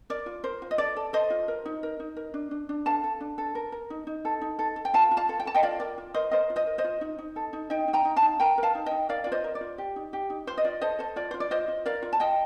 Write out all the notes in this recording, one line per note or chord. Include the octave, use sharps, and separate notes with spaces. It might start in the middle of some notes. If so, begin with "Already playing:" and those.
A#4 D5
F4
A#4 C5
F4
D#5
A4 D5
A4
A4 C5 D#5
F4
A#4
D#4
A#4
D#4
A#4
D4
D4
D4
A4 F5 A5
A4
D4
A4
A#4
A#4
D#4
D#4
A4
D#4
A4
A4
G5
F4 F5 A5
F4
F5 A5
A4
G5
A4 A5
D#5 G5
F4 D5 F5
A#4 D5
F4
A#4 C5 D#5
A#4 C5 D#5
F4
C5 D#5
A#4
C5 D#5
F4
D#4
D#4
A4
D#4
D#4 D#5 G5
D#4
G5 A#5
D#4
F5 A5
D#4
A#4 G5 A#5
A#4
F5 A5
D#4
D#4 D#5 G5
A#4 D5 F5
F4 D5
C5 D#5
A#4
D5
F4
G4
D#4
G4
D#4
F4 C5
D#5
F4 D5
A4 C5 D#5
A4 C5
F4 D5
F4 C5
D5
F4 C5 D#5
F4
A#4 D5 F5
F4
A5
F4 D#5 G5